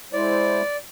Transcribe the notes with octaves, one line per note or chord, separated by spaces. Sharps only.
G#3 E4 C5 D5